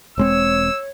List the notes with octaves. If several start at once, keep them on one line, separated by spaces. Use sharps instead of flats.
E1 G#3 C4 C#5 E6